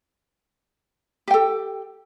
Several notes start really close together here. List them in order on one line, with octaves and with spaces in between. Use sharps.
G4 G5 A4